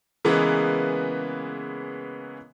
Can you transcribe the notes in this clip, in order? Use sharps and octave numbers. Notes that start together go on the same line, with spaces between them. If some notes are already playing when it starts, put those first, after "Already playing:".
C#3 E3 G#3 A#3 B3